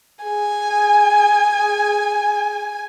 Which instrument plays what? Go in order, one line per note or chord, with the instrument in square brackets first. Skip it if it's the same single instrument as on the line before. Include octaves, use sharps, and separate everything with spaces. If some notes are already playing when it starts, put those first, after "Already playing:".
[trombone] G#4 [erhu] G#5